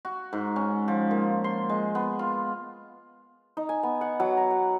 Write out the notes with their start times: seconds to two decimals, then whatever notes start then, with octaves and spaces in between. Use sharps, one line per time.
0.05 F#4
0.33 G#2
0.56 C#4
0.88 F3
1.11 A#2
1.44 C6
1.69 G#3
1.95 B3
2.19 F4
3.57 D#4
3.69 G#5
3.83 B3
4.01 F#5
4.20 F#3
4.37 A#5
4.51 F#5